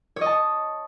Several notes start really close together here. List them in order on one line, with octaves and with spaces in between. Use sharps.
C#5 D#5 A5